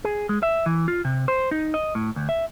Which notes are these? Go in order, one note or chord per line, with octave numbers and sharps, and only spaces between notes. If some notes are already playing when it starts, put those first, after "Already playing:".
G#4
G#3
E5
E3
F4
C3
C5
D#4
D#5
A2
D2
E5